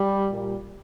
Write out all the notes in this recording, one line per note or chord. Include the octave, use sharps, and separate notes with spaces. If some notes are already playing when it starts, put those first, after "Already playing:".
Already playing: G3
A#2 G3